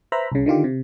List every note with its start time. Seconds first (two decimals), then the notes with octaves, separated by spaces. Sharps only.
0.12 B4 C5 E5 A#5 B5
0.32 C2 C#3
0.46 D3 D#3 F4 G4
0.64 C3